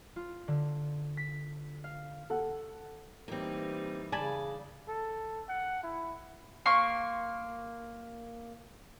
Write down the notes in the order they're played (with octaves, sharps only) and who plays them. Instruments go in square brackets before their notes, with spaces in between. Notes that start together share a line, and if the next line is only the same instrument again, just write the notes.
[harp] F4
D3
B6
F5
[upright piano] A4 F#5
[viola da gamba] E3 G3 D#4 [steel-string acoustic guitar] A#3 C4
[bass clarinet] C#3 [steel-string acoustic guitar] D5 [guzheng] G#5 A5 B5
[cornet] A4
F#5
E4
[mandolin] A#3 C6 C#6